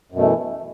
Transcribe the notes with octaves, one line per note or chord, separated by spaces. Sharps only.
F#2 B2 E3 A3